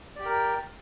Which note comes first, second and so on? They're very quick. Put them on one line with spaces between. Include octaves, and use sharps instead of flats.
D5 G4 G5 A#4